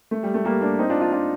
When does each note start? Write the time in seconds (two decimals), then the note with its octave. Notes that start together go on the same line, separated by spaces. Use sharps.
0.11 A3
0.23 G3
0.34 A3
0.45 G3 A#3
0.61 A#3 D4
0.79 C4 D#4
0.89 D4 F4
1.01 D4 F4
1.12 D4 F4